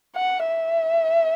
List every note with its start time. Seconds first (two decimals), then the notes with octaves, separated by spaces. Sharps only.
0.16 F#5
0.48 E5